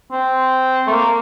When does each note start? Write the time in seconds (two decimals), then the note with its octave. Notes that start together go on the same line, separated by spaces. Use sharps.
0.11 C4
0.87 A3
0.91 A#3